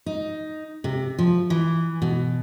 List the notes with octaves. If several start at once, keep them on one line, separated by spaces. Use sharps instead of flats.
D#4
C3
F3
E3
B2